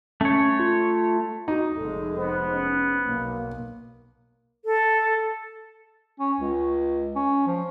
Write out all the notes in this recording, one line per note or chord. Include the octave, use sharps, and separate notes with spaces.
A3 C#4 C#5
F4
D#4 F#4
F1 G#3 A4
B3 C5
C#4
B1 A#3
A4
C#4
C#2
C#4
F3